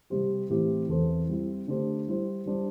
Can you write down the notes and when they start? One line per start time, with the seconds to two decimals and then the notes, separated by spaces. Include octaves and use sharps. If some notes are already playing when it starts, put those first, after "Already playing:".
0.10 C3 G3 C4 G4 C5
0.49 A2 E3 C4 E4 G4
0.89 E2 E3 C4 A4 C5
1.28 G3 C4 E4
1.67 D3 A3 D4 G4 C5
2.08 G3 E4 C5
2.46 G3 D4 C5